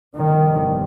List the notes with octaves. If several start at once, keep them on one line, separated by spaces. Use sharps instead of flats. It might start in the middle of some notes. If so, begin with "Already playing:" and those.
G1 F2 C3 D#3